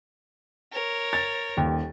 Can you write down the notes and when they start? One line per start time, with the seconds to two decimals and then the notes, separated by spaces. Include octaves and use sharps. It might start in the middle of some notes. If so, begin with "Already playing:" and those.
0.72 A#4 C#5
1.13 A6
1.57 D#1 D#2